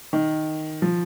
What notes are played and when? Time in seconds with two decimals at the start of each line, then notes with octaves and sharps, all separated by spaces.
0.13 D#3
0.82 F3